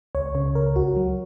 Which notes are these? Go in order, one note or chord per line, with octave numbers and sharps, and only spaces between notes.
C#2 C#5
C#3 C#5
C#2 A#4
C#2 F#4
F#3